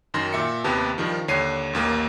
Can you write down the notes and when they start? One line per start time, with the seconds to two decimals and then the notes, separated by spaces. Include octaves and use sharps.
0.14 F#2 D#3 C6 A#6
0.33 A#2 E5 C#7
0.64 D#2 C3 B3 G4 A5
0.98 G2 D#3 F3
1.28 D#2 D3 C#5 C7 D#7
1.73 A1 D#2 A#3 D#7